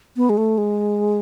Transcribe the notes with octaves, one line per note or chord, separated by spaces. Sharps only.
B3
G#3
A3
G#3